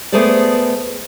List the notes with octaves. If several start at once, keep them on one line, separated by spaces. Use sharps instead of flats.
A3 B3 G#4 A4 C5 D5